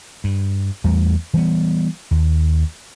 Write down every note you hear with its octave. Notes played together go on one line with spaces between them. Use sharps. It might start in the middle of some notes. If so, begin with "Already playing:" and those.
G2
E2 G3 A3
E3 G3 B3
D#2